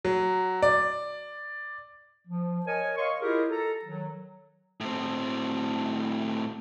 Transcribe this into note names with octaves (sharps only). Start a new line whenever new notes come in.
F#3
D5
F3
A#4 C#5 D#5 G#5
C#5 D#5 F5 C6 C#6
E4 F4 G4 G#4 A#4 D#5
A4 A#5
D#3 F#3
A2 C4